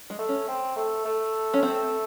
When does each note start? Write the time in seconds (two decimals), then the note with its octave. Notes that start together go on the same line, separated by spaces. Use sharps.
0.10 G#3
0.19 A3
0.29 C#4
0.48 C4
0.76 A3
1.05 A3
1.54 C#4
1.63 C4